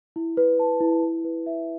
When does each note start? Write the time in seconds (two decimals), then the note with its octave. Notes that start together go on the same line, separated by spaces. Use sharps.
0.16 E4
0.37 B4
0.59 A5
0.81 E4
1.03 E4
1.24 B4
1.46 E5